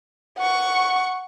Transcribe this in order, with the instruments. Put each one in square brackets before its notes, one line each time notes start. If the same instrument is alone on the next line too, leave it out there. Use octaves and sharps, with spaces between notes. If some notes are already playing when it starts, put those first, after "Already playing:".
[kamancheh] F#5 C#6